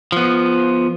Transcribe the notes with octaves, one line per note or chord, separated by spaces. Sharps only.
F3 B3